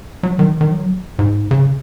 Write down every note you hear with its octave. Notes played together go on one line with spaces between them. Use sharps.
F#3
D#3
D#3
F#3
G#2
C#3